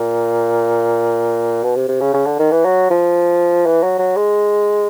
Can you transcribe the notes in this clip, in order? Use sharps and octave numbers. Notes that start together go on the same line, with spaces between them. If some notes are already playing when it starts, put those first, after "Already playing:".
Already playing: A#2
B2
C3
C3
C#3
C#3
D3
D#3
E3
F#3
F3
E3
F#3
F#3
G#3